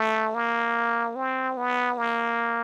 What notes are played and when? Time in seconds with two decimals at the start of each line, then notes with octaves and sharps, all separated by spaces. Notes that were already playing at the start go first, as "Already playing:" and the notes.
Already playing: A3
0.35 A#3
1.15 C4
1.57 B3
1.98 A#3